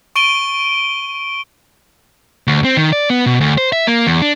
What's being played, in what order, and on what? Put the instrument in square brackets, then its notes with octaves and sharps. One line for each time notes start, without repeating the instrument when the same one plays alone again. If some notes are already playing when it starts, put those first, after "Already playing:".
[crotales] C#6 D7 D#7 G7
[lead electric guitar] D2
C4
D#3
D5
B3
B2
D2
C5
E5
A#3
E2
D4